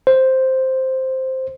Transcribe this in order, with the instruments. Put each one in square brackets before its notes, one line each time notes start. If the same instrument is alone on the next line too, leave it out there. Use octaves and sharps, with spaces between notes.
[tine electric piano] C5